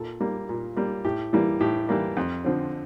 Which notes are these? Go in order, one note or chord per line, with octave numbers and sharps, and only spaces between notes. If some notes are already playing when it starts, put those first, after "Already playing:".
Already playing: A#2 A4
G3 A#3
A#2
G3 A#3
A2 G4
E3 G3 A#3
A2 G4
E3 G3 A#3
F2
D3 F3 C4